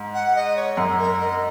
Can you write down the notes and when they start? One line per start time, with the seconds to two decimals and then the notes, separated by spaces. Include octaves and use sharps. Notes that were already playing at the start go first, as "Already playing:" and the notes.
Already playing: G#2
0.14 F#5
0.35 D#5
0.56 C#5
0.77 F#2
0.99 A#4
1.20 D#5